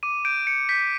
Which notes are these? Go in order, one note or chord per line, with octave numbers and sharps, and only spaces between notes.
D6 D#7
G6 D7
G6 C#7
G6 B6